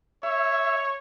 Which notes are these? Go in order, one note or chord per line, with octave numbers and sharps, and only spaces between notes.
C#5 E5